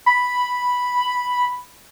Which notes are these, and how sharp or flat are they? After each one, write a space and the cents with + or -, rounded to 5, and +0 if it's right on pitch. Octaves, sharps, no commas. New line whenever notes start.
B5 +0